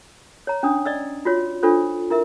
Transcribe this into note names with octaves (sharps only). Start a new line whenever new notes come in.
C#5 A#5
C#4 D4 D#6
D5 D#5 E6
F4 F#4 C#5
D4 F4 A4 C5
E4 A#4 E5